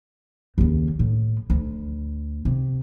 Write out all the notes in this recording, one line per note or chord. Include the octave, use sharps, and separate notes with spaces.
D#2 C#3
A2
D2
C3